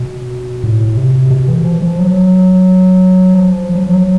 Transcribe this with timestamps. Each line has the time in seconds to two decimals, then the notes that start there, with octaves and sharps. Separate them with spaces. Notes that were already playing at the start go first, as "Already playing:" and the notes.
Already playing: B2
0.64 A2
0.97 C3
1.31 B2
1.48 E3
1.64 F3
1.82 F3
1.99 F#3
3.33 F3
3.75 F#3
3.83 F3
3.89 F#3